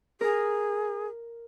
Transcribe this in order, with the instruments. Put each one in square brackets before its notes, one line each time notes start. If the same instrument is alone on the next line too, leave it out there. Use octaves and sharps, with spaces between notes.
[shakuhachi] G#4 [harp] A#4